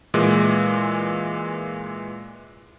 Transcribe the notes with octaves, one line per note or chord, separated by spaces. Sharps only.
A#2 E3 G#3